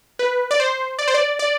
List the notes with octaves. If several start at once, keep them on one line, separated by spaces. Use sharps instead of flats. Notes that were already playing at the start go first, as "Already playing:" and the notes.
B4
D5
C5
D5
C5
D5
D5